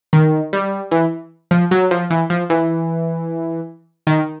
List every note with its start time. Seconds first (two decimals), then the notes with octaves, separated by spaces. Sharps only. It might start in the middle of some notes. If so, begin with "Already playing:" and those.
0.13 D#3
0.53 G3
0.91 E3
1.51 F3
1.71 F#3
1.91 F3
2.10 E3
2.30 F3
2.50 E3
4.07 D#3